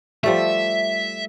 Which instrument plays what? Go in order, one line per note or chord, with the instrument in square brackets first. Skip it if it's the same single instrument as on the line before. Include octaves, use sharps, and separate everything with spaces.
[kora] F3 G3 A3 [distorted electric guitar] E5